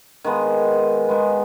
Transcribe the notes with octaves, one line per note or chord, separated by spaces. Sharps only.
D#3 G#3 B3
D#3 G#3 B3